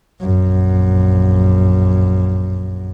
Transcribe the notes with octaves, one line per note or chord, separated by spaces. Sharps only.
A#1 F#2